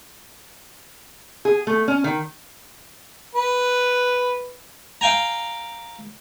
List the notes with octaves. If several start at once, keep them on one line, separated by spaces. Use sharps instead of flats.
G#4
A3
C#4
D#3
B4
F5 G5 G#5 A#5